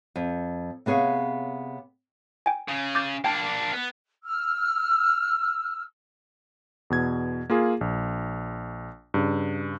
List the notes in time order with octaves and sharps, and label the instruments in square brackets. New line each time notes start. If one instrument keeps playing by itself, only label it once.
[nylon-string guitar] F2
C3 B3 G#4 C#5 F5
[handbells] G5 G#5
[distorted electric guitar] C#3
[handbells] D6 G6 A6
[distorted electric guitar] A#3 D4 [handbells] G5 A5
[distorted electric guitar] B3
[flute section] E6 F6
[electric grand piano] E2 B2 G#6
A#3 F4 G#4
A#1
G2 C#3